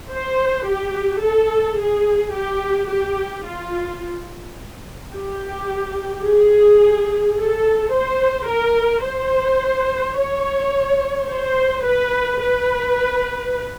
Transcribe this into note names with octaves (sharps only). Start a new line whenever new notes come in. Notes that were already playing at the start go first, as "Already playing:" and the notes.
C5
G4
A4
G#4
G4
G4
F4
G4
G#4
A4
C5
A#4
C5
C#5
C5
B4
B4